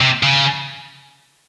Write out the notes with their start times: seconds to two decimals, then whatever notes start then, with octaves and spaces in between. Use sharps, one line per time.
0.01 C3
0.23 C#3